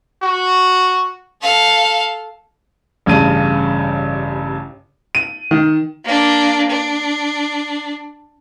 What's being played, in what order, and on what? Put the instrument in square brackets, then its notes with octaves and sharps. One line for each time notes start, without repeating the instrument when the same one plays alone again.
[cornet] F#4
[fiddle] A4 F5
[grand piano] A1 G2 C#3 A5 D#7
D#7
D#3
[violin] A#3 D4
D4